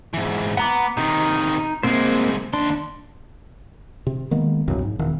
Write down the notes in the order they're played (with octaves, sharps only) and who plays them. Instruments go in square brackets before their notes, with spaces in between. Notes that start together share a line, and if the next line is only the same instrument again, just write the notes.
[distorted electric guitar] G#2 E3
[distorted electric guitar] B3 [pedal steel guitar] F#5 A#5 D6
[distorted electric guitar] C3 D#3 [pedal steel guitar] D#4
[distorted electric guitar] C2 G#3 [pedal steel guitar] A#3 C4 C5
[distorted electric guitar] D#2 C6 [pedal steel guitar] D4
[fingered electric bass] C3
D#3 G#3 A#3 B3
E1 C2 F#2 F#3
G#2
E1 D#3